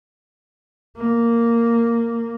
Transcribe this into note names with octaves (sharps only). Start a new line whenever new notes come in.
A#3